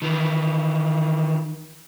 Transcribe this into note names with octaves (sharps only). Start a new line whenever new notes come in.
D#3 E3